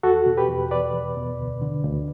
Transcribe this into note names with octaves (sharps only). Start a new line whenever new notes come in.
E2 F#4 A4
B2
G4 B4
E2
B2 B4 D5
E2
B2
D2
D3
D2